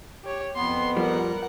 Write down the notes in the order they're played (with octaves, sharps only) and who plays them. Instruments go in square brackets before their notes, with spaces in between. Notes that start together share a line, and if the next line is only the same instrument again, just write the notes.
[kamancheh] G4 C#5
[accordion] F2 B3 [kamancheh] C6
[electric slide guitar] F3 G3 [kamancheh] A#4 F#5